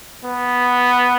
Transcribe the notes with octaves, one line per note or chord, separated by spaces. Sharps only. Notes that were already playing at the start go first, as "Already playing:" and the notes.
B3